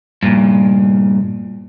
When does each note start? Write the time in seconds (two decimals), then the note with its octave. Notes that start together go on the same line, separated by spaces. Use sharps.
0.23 G2 A#2